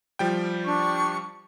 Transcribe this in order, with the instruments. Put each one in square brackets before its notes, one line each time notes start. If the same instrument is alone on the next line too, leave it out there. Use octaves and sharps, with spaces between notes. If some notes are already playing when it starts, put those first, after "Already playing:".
[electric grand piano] F3 G3 G5
[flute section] D4 C#6